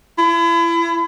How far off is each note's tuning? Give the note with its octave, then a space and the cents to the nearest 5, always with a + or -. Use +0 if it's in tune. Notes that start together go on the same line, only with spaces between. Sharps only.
E4 +35